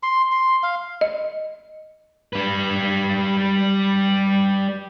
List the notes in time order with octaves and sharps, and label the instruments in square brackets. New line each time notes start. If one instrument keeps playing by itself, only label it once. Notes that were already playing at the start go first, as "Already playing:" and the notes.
[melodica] C6
C6
F5
[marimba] D#5
[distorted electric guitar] G3 B4